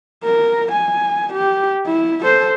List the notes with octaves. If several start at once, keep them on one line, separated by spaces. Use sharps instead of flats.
A#4
G#5
G4
E4
A4 C5